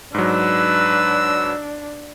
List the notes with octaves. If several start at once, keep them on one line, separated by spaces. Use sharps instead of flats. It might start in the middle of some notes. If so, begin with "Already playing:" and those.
G#2 F#3 D4 B4 E6